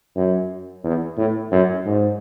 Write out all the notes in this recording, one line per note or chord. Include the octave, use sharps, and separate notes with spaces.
F#2
E2
A2
F#2
G#2